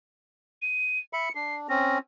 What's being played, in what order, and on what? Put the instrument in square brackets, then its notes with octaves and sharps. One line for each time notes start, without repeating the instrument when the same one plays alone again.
[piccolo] D#7
[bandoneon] E5 B5 [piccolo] C#7
[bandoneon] D4 [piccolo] C7
[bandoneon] C4 C#4 [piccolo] A#6